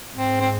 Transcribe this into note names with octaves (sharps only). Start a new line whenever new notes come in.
G#2 C4
C4